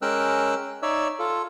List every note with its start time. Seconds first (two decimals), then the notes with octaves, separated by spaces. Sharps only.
0.02 G#3 C#4 A#4 G5 E6 F#6
0.82 D#4 C#5 D5 E5 E6
1.19 F4 A4